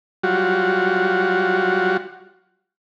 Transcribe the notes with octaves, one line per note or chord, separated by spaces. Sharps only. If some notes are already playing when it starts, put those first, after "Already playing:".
F#3 G3 F4 F#4